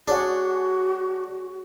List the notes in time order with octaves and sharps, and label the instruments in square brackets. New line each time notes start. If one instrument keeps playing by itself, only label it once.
[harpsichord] D4 [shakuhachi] F#4 [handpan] G#4 C#5 F#5